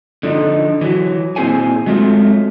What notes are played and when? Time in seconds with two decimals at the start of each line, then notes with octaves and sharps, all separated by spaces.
0.23 D3 F3 D4 D#4
0.81 E3 F#3
1.36 A#2 C4 E4 G#4 C5 G#5
1.86 F#3 G#3 A3 C4 F4